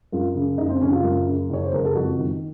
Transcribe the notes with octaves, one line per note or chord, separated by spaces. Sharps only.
F#2 F4
C#3
F#1 D#4
C4
F#1 C#4
F4
F#2
C#3
F#1 C#5
C5
F#1 A#4
A4
F2 F#4
D#3